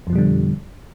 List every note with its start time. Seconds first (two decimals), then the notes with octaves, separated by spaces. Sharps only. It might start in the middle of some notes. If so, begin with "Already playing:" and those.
0.07 F2
0.10 F3
0.13 B2
0.16 G3
0.18 D3